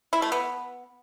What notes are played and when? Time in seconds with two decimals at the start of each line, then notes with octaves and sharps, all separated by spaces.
0.13 E4
0.22 A3
0.32 B3